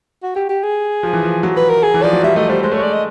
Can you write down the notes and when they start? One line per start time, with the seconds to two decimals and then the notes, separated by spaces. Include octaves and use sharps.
0.23 F#4
0.36 G4
0.49 G4
0.63 G#4
1.03 F3
1.13 E3
1.23 F3
1.43 F#3
1.57 B4
1.70 A#4
1.83 G#4
1.94 E3
2.03 F3 D5
2.13 F#3
2.23 G3 E5
2.36 A3 D#5
2.49 G3 C5
2.63 G#3 C5
2.72 A3 C#5
2.79 G#3 D5
2.93 D#5